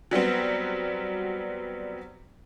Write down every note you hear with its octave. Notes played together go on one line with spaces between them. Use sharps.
F#3 G3 B3 C4